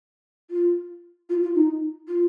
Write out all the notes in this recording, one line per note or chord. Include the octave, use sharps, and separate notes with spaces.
F4
F4
F4
D#4
F4